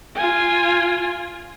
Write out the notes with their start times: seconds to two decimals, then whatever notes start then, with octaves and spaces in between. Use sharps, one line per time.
0.15 F4 G#5